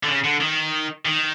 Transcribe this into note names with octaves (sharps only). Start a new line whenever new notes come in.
D3
C#3
D3
D#3
D#3